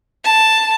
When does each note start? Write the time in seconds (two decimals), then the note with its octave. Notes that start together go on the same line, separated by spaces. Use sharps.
0.25 A5